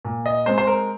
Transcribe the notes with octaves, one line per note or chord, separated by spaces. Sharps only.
A#2
D#5
G#3 C4 C5
C5
A#4